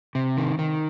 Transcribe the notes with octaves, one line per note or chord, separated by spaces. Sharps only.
C3
D#3
D#3